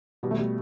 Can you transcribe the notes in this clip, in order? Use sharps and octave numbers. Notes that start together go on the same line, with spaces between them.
B2 G3
A3
G3